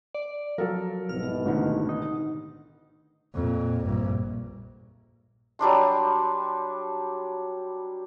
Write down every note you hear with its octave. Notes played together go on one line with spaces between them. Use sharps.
D5
F3 F#3 A4 A#4
C2 G#2 B2 F6
A1 D3 D#3
D#4
F2 A#2
A#1 G2
F#3 G3 D4 C6